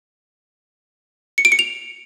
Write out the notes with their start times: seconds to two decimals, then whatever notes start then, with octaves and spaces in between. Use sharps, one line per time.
1.38 C#7
1.45 D7
1.52 C#7
1.59 F7